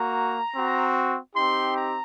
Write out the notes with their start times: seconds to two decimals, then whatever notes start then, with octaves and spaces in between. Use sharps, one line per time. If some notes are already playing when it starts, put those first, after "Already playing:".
Already playing: A#3 F#4 A#5
0.54 C4 F#4
1.34 C4 D#4 G4 C6
1.74 A#5